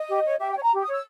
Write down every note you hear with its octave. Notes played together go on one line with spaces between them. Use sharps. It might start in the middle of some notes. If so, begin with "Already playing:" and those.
Already playing: D#5
G4
C#5
G4 E5
G5
C#5
A#5
G4
D#6
C#5 E6